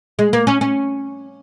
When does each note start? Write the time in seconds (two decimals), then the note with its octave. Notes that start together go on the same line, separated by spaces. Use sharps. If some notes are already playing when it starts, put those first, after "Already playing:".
0.19 G#3
0.33 A#3
0.47 C#4
0.61 C#4